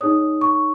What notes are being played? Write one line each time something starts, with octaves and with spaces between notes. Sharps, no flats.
D#4 G#4 C#5 D#6
C#6